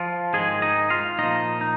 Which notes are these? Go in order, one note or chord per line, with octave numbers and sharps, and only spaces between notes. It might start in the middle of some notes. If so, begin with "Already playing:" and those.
Already playing: F3 F4
G#2 D#3 G#3 G#4
D#4 D#5
F4 F5
A#2 F3 D#4 D#5
D#4